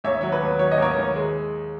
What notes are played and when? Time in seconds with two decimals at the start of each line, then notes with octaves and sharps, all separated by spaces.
0.04 D#2 C#5 E5
0.21 F#3 C#5
0.32 B4
0.41 D#2
0.59 F#3 C#5
0.71 D#5
0.78 D#2 A#4 C#5
0.97 D#2
1.15 G#3